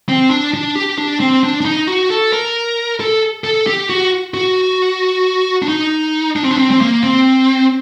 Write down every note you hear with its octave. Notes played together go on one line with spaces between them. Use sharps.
C4
D4
D4
G4
D4
C4
D4
D4
D#4
F#4
A4
A#4
A4
A4
G4
F#4
F#4
D4
D#4
D4
C4
D4
C4
C4
A#3
C4